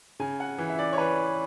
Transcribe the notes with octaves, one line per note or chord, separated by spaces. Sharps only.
C#3 G#5
F#5
E3
E5
D5
C#5
E3 B4